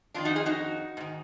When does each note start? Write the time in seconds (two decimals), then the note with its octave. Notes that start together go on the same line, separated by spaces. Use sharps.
0.14 F2 D#3 D4 F4
0.25 D#4 F#4
0.36 F4 G#4
0.46 D#4 F#4
0.97 G#2 D#3